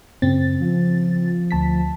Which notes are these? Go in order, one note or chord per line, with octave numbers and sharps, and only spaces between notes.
F#2 C#3 C4 A6
F3
D2 A5 B6